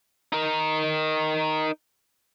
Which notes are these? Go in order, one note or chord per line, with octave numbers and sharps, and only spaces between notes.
D#4 A#4